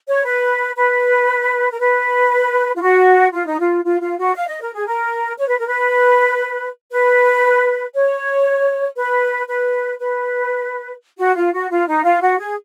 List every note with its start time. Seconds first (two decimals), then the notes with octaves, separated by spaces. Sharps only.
0.08 C#5
0.25 B4
0.76 B4
1.72 A#4
1.79 B4
2.76 F4
2.82 F#4
3.33 F4
3.46 D#4
3.59 F4
3.84 F4
4.01 F4
4.18 F#4
4.35 F5
4.48 D#5
4.61 A#4
4.74 G#4
4.86 A#4
5.38 C#5
5.48 B4
5.58 A#4
5.67 B4
6.92 B4
7.94 C#5
8.97 B4
9.48 B4
10.00 B4
11.18 F#4
11.35 F4
11.53 F#4
11.70 F4
11.87 D#4
12.04 F4
12.21 F#4
12.38 G#4